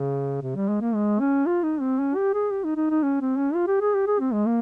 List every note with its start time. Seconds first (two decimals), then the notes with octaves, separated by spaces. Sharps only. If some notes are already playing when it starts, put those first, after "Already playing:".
Already playing: C#3
0.42 C3
0.56 G3
0.68 G#3
0.81 A#3
0.95 G#3
1.20 C#4
1.46 F4
1.63 D#4
1.81 C4
1.99 C#4
2.16 G4
2.33 G#4
2.51 G4
2.64 D#4
2.76 D#4
2.90 D#4
3.03 C#4
3.21 C4
3.37 C#4
3.54 F4
3.67 G4
3.81 G#4
3.94 G4
4.07 G#4
4.20 C4
4.33 G#3
4.46 A#3